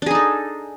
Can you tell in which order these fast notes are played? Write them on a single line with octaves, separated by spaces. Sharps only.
D4 G#4 D#4 A4